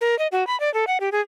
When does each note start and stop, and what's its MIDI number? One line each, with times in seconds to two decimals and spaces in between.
0.01 0.18 70
0.19 0.27 75
0.32 0.46 66
0.47 0.58 83
0.60 0.72 74
0.74 0.85 69
0.87 0.98 78
1.00 1.09 67
1.12 1.21 68